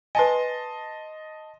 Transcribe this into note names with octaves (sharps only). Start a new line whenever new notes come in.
B4 D#5 G#5 A5 C6